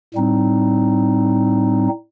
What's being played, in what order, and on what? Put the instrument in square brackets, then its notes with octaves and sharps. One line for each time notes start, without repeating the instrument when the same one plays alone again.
[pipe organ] A2 G3 C4 D#4